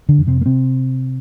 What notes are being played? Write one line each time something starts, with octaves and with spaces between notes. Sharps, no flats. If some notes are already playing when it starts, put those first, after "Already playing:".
D3 D4
F2
C3 C4
A#3
C3 C4